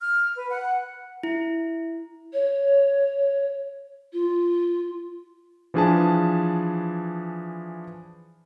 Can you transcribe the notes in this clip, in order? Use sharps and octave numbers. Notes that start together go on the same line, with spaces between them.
F6
B4
F#5
E4
C#5
F4
E3 F3 D4 G#4 B4 A5